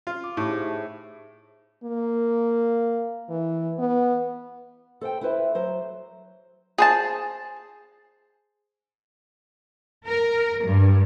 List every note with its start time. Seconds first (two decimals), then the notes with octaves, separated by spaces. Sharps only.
0.07 F4
0.24 D6
0.37 A2 D#4 E4 G4
0.49 G#4 C5 E5
1.84 A#3
3.29 E3
3.79 B3
5.01 A4 C5 F#5 G5
5.21 E4 B4 C5 E5
5.55 F#3 C5
6.78 G#4 C5 A5
10.06 A#4
10.65 G2